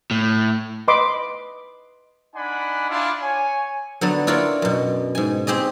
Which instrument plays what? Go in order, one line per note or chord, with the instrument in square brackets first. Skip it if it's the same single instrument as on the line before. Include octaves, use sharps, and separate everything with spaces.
[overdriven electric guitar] A2
[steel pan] B4 D#5 B5 C6 D6
[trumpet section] D4 D#4 D5 F#5 G#5 B5
D4 E4 F4
C#5 G#5
[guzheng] D3 F#3 B3 A4
D4 E4 F4 A#4 C#5 D5
F#2 B2
G#2 G#5
C4 G4 G#4 D#5